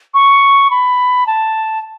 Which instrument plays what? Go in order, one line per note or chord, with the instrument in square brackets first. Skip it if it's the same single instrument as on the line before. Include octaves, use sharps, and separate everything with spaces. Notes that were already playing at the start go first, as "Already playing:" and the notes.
[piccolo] C#6
B5
A5